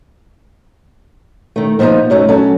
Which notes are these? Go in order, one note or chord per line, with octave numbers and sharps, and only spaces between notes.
D#3 A3
A#2 F3 B3 D4 D#4
F#2 F#3 A3 D#4
F#3 C#4 A4